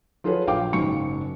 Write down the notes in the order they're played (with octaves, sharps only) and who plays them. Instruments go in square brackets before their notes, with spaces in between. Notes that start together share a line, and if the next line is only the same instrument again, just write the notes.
[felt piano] F#3 F4 G#4 A4 B4 C#5
A#1 F5 G5 D6
F#1 G#2 F#3 C#6 C#7